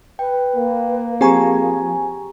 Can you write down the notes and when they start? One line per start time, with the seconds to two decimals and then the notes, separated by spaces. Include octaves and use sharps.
0.19 B4 G5
0.56 A#3
1.21 F3 C4 G4 G#4 G#5 A#5 C#6